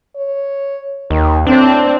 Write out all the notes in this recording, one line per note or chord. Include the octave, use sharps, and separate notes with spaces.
C#5
D#2 D#3
A2 C4 D4